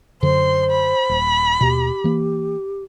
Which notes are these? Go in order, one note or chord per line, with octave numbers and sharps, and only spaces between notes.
F#2 D3 C5 C6
B5
D#1
D#2 B2 G4
E3 A#3